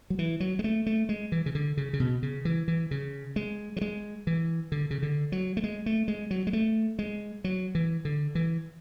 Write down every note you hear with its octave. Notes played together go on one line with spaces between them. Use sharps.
F#3
E3
F#3
G#3
A3
A3
G#3
E3
C#3
D3
C#3
C#3
B2
C#3
E3
E3
C#3
G#3
F#3
G#3
E3
D3
C#3
D3
F#3
A3
G#3
A3
G#3
F#3
G#3
A3
G#3
F#3
E3
D3
E3